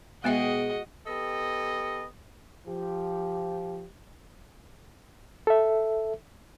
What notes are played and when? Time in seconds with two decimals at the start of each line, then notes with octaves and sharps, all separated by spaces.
0.24 B2 G#3 B3 F#4 G#4 D#5 E5 G5
1.07 B3 G4 A4 D#5
2.67 F3 G4
5.47 A4 E5